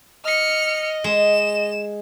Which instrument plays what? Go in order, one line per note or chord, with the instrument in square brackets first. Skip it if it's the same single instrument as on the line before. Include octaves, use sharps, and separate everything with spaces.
[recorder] D#5 [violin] F6 C#7
[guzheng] G#3 [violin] E7